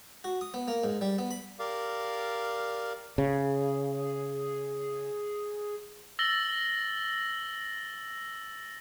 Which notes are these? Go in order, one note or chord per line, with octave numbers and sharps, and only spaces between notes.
F#4
D#6
B3
A#3
G#2
G3
B3
B5
G4 A#4 D5 F5
C#3 G#4
E6 A6 A#6 F#7 G7